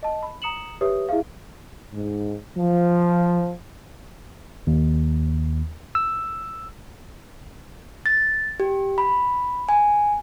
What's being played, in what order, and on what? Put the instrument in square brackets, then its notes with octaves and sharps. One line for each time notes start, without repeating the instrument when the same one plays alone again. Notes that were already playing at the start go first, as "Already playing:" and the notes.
[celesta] D#5 A5
B5
A#5 D#6 C#7 E7 F#7
G4 B4 C#5 E5 D#6
E4 G#4 E5 F5
[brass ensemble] G#2
F3
[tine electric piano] D#2
E6
[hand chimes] A6
G4
B5
G#5